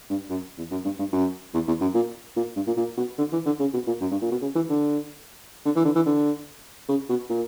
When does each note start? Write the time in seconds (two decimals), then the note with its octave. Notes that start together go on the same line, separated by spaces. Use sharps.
0.10 G2
0.30 F#2
0.58 E2
0.71 F#2
0.85 G2
0.99 G2
1.13 F#2
1.54 E2
1.67 E2
1.81 F#2
1.94 A#2
2.37 A#2
2.56 G2
2.67 A#2
2.77 A#2
2.98 B2
3.18 D3
3.33 E3
3.46 D3
3.60 C#3
3.74 B2
3.87 A#2
4.01 F#2
4.11 G2
4.22 A#2
4.31 B2
4.42 C#3
4.55 E3
4.69 D3
5.66 D3
5.76 E3
5.85 D3
5.96 E3
6.06 D3
6.89 C#3
7.09 B2
7.30 A#2